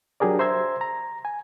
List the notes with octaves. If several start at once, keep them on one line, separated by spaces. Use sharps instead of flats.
F#3 D4 G4 G#4 A#4 D5
C5 E5 A#5 C6 E6 G#6
A#5
G#5